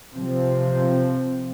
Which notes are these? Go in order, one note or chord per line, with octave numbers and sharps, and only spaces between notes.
C3 F3 C4